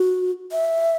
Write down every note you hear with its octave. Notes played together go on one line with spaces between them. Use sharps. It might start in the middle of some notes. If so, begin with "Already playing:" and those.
Already playing: F#4
E5